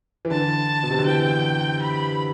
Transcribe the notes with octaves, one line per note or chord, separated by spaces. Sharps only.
E3
D3 A5
B2
C3
D3
E3 G5
B5